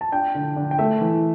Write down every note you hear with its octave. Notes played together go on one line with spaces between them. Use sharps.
A5
D4 G5
D3
D3
G5
A3 E5
E3